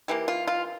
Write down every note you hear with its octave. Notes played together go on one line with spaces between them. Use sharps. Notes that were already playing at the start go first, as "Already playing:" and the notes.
E3 A#3 G4
F4
F4